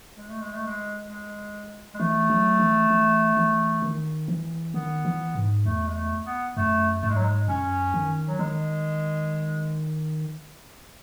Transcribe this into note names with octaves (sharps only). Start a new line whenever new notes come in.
G#3
A3
G#3
A3
G#3
G#3
G#3
E3 A3
F#3
E3
E3
E3
D#3
E3
D#3 B3
E3
G#2
E2 A3
G#3
A3
B3
F#2 A3
G#2 A3
G#3
F#3
G#3
F#2 C#4
D#3
F#3
D#3 G#3